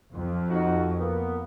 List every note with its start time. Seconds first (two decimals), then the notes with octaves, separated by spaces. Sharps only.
0.15 F2
0.49 D#4 F#4
0.98 A#3 B3